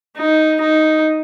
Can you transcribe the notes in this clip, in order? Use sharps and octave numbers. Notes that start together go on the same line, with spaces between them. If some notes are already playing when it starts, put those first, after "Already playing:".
D#4
D#4